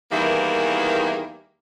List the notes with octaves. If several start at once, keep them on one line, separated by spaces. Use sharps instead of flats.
E2 D#3 E3 G3 A#3